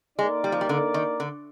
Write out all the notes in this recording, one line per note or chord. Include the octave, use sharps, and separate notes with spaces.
G#3 A#3 D#4 A#4 D5
G3
F3
G3
D3
D#3
D3